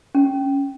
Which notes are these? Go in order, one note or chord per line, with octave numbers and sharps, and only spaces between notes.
C#4